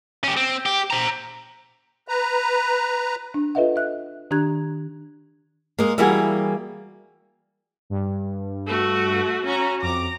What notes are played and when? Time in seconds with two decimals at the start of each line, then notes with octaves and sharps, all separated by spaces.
0.24 C#4 G4
0.37 C4
0.66 G4
0.91 C5 A#5
2.08 B4 A#5
3.34 D4
3.55 F4 A4 B4 D#5 E5 F#5
3.76 E5 F#6
4.31 D#3 D4 G4 A#5 F#6 G#6
5.79 G#3 A#3
5.98 E3 G3 A#3 E4 F#4 G#4
7.90 G2
8.67 A3 F#4
9.46 C#4 F#4 A#5
9.81 F2 A#5 D6